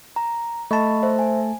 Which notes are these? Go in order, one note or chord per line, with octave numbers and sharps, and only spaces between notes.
A#5
A3 D#5 A5 B5 C#6
C5 E5
G#5